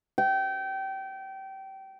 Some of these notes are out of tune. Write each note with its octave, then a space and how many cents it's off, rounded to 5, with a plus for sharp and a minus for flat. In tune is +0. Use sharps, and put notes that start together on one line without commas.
G5 -25